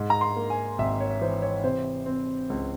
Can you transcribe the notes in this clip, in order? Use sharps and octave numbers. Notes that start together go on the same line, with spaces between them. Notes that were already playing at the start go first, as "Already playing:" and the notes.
Already playing: G#2
A#5
C6
A#3
G#5
G#1 E5
C#5
E3 C5
C#5
C3 C5
C4
C#2